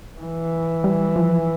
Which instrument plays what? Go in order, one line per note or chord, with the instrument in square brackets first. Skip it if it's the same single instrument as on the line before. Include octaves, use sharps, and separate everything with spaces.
[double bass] E3
[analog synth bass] G3
F3